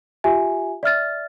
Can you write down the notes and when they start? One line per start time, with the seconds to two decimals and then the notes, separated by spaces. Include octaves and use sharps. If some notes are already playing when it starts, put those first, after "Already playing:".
0.24 F4 G4 E5 G#5
0.83 D5 E5 F6 A6